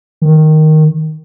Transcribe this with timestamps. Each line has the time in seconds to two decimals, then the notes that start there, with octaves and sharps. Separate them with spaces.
0.22 D#3